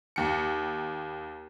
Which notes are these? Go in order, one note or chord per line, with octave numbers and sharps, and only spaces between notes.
D#2 C#7